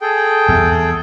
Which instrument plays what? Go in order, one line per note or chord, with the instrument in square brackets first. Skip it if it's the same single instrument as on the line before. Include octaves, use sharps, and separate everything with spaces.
[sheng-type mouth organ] G#4 A4 G5
[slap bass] E2